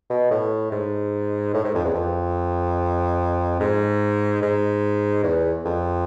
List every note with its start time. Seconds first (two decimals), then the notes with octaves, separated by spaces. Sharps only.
0.10 B2
0.31 A2
0.71 G#2
1.54 A2
1.64 G#2
1.75 F2
1.84 E2
1.94 F2
3.60 G#2
4.42 G#2
5.23 E2
5.65 F2